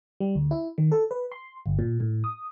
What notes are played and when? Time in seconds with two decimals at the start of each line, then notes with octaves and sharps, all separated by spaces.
0.20 G3
0.35 D2
0.51 E4
0.78 D#3
0.92 A4
1.11 B4
1.32 C6
1.66 G1
1.79 A#2
2.00 A2
2.24 D#6